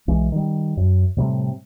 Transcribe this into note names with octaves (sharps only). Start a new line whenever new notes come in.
B1 E3 G#3
D#3 G3
F#2
A2 C3 G3 A3